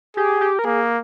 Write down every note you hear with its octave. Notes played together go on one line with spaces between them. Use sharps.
G4 G#4
G4
A#4
A#3 G#4